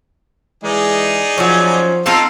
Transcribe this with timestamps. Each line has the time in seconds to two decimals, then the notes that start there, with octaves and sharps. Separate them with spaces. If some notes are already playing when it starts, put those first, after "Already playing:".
0.64 E3 G#3 D#4 G#4 D5
1.38 F3 F#3 C#4
2.06 C4 D#4 F4 A4 F5